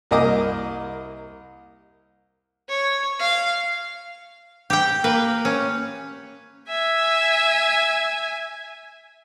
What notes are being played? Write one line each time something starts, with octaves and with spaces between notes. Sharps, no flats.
C2 A#3 D#5 D6 D#6
C#5
F5
G4 G5
A#3 B4
C#4
E5 G#5